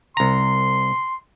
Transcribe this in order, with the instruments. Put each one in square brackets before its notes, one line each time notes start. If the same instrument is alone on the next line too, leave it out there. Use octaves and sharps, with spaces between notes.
[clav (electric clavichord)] C2 A#5 [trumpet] C6